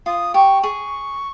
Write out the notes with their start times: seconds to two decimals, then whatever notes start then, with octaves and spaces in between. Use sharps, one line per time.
0.06 F4 D#6
0.34 G4 C#6
0.63 G#4 C#6